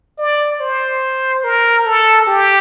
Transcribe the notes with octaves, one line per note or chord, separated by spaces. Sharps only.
D5
C5
A#4
A4
G4